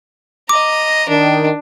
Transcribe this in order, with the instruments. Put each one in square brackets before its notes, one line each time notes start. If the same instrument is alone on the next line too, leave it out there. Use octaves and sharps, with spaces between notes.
[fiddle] D#5 A#5 [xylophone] D6
[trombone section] D#3 [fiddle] D4